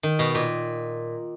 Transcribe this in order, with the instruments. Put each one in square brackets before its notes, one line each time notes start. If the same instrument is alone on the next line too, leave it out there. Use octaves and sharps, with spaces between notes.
[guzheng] D#3
B2
A#2